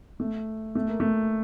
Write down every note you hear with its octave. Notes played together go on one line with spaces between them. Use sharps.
A3
A3
A#3
A3